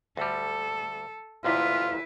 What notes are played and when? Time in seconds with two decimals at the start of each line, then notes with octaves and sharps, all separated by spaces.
0.17 D2 G3 A4
1.44 A1 D2 A#2 E4 F4 B4